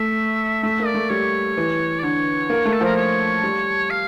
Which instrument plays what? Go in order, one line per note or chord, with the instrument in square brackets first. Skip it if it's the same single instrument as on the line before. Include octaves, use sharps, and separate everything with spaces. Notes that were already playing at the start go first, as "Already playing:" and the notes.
Already playing: [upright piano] A3 [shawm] E5
[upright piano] A3 [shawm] E5
[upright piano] A#3
[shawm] D5
[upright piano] A3
[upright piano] G3 [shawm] C#5
[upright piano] E3
[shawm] D5
[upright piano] D3 [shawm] C#5
[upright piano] A#3
A3
[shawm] A4
[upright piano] F3 [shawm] A#4
[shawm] C#5
[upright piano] G3
[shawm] F5